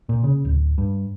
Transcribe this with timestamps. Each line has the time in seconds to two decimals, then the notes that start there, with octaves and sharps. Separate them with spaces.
0.09 A#2
0.24 C#3
0.45 D1
0.78 G2